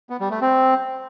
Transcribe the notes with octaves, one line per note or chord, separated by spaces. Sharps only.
B3
G3
A3
C4